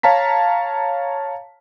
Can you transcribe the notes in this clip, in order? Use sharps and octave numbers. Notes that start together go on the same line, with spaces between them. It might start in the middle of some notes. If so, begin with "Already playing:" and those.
C#5 F5 A5 A#5 B6